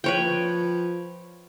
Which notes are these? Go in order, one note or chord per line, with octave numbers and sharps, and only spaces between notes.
F3 B4 C#5 G5